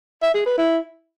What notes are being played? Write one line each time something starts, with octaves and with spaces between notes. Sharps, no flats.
E5
G#4
B4
E4